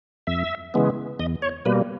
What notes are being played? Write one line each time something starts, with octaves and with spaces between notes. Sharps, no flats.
F2 E5
C#3 E3 G#3 B3
E2 D#5
C#5
B2 G3 A#3 B4